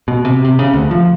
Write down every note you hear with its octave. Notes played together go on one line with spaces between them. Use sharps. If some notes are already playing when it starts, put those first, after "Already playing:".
B2
C3
C3
C#3
D2
F3